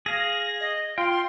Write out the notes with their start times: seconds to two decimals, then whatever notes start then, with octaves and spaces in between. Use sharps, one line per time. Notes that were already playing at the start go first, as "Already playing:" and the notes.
0.06 G#4 F5 A#6
0.60 D#5
0.98 F4 G5 C6